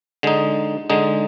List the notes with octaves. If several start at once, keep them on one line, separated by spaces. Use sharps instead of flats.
D3 G#3 D#4
D3 G#3 D#4